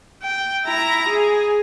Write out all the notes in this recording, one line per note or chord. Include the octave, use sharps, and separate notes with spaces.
G5
E4 A#5
G#4